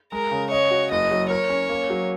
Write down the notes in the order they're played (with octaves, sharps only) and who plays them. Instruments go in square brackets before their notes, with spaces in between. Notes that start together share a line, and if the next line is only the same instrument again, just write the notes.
[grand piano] G#3 [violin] A#4
[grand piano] C#3
[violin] C#5 [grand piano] D#5
[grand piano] F#4
[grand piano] F#1 [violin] D#5
[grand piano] F#3
[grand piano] A#4 [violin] C#5
[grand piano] C#4
A#3
F#3